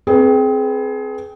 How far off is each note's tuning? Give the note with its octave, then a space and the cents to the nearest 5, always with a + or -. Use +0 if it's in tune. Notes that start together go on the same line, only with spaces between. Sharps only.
C4 +0 G#4 +25 B4 +0